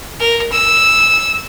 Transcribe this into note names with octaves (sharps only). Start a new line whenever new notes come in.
A#4
E6